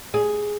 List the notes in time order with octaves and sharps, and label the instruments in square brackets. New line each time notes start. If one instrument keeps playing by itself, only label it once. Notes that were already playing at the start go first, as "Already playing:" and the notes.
[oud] G#4